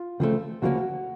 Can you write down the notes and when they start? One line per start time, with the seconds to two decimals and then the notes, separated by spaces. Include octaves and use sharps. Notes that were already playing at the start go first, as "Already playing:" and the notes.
Already playing: F4
0.20 C#2 C#3 F3 A3 C4
0.62 D2 C#3 F3 A#3 C#4 F#4